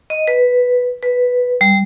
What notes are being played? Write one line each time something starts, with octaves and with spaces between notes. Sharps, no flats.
D#5
B4
B4
G3